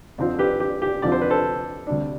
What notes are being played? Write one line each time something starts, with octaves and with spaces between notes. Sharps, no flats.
F2 D3 F3 C4 F4
G4 B4
G4
G4
F2 D3 F3 C4 F4 D5
C5
B4
A4 C5
D2 C3 G3 D4